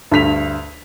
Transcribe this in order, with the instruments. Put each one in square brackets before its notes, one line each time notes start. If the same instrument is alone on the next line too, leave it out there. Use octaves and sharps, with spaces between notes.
[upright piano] D2 G2 B6 F7